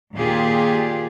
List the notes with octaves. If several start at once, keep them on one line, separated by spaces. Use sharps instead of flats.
D#2 A#2 F4 G4 G#4